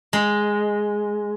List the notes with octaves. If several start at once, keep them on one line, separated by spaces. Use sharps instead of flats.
G#3